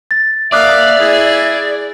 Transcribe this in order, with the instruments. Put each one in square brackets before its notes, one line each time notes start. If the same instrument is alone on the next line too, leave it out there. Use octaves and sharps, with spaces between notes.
[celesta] A6
[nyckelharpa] A#3 F5 [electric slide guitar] D5 [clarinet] E5 [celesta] D6 D#6 F#6
[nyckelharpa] E4 G#4